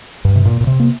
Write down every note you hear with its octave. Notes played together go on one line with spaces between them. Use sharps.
G2
C3
A#2
A#2
C3
A#3